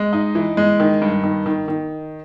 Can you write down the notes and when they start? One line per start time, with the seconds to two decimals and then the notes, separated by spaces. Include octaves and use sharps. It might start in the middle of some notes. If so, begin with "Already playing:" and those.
Already playing: G#3
0.13 D#4
0.35 E3
0.57 G#3
0.80 D#3
1.01 G2
1.24 D#3
1.46 D#3
1.68 D#3